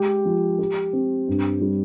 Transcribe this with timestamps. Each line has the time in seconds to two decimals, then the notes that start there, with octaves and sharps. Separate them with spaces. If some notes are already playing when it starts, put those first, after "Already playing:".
Already playing: G#3 G4
0.25 F3
0.59 G4
0.93 C4
1.28 G2
1.61 G3